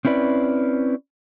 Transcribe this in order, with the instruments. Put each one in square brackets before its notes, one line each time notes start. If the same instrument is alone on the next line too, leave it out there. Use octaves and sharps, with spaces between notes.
[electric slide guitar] C4 C#4 E4 B4 D5